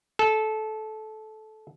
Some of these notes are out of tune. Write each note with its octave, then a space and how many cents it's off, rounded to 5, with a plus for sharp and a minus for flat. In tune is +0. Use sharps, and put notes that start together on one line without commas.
A4 -20